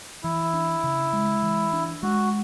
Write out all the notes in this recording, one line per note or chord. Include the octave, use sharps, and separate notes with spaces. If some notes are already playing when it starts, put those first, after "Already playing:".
E3 E4
D4
C#3
G#3
E3
D4
G#3 F#4